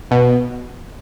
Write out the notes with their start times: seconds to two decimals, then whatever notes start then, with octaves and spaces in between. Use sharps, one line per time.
0.11 B2